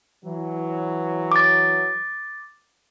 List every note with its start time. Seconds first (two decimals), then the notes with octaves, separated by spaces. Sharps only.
0.25 E3 F#3
1.32 D6 A6